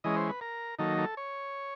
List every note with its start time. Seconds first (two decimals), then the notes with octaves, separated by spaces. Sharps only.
0.04 E3 G#3 C#4 D#5
0.17 C5
0.29 B4
0.41 A#4
0.79 D#3 F#3 A#3 D#4 A4
0.98 A4
1.17 C#5